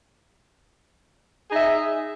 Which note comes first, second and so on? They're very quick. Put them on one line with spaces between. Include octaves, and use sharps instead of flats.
G#4 D#4 E5